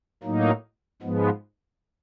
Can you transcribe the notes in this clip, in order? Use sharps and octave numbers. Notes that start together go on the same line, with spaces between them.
A2 F#3 A#3 D#4
G#2 F3 G#3 B3